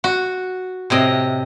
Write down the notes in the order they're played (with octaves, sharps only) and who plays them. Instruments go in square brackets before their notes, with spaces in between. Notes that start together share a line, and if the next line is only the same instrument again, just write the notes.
[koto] F#4
A2 C3 D#5